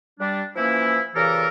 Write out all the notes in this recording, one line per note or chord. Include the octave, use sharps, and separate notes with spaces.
G3 D4
E3 F3 A#3 C#4 E4
A#2 C#3 E3 G4 A4 A#4